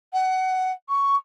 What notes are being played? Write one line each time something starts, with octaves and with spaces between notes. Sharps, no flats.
F#5
C#6